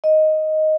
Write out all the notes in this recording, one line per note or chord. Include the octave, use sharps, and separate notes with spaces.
D#5